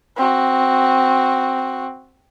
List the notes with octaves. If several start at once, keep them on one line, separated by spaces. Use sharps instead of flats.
C4 F#4